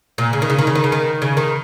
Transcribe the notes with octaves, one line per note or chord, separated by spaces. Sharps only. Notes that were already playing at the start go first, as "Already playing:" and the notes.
A#2
C#3
D#3
C#3
D#3
C#3
D#3
C#3
D#3
C#3
D#3